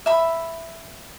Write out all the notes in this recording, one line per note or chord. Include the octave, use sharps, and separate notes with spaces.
E5 B5